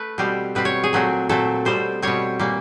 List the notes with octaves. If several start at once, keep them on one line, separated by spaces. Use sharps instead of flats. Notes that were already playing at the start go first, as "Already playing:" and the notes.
Already playing: A3 B4
B2 G3 C4
B2 G3 C4 B4
C#5
G#4
A#2 F#3 A3 C4
A#2 F#3 A3 C4 A4
B2 G3 C4 C5
B2 G3 C4 C#5
A#2 G3 A#3